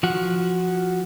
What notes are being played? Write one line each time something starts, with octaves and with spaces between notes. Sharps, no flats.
F3 F#4